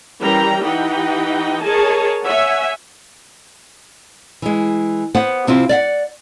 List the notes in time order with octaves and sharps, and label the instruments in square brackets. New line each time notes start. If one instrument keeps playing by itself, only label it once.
[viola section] E3 G3 C#4 A#4 G5 A#5
E3 D#4 G4 D#5 F#5 G5
G#4 A#4 C#5 D#5 G#5 A5
C#5 E5 F#5 G#5
[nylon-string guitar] E3 G#3
B3 C5 F#5
C3 C4 E4 F4
D5 E5 F#5